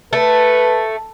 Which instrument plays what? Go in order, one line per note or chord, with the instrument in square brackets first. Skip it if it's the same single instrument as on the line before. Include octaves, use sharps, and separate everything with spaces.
[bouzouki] A3 [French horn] B4